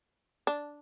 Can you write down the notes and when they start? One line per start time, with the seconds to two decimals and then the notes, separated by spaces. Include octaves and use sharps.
0.47 D4